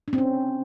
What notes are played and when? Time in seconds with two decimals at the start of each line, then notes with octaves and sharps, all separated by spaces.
0.08 D4
0.13 C4
0.18 C#4